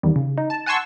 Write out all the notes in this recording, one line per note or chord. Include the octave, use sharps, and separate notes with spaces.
E2 D#3 G3
C#3
D#4
A5
F#5 G#5 A5 C6 C#6 E6